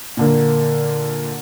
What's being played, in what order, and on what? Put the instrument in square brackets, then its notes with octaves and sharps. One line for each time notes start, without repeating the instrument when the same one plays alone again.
[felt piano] A#2 D3 A#3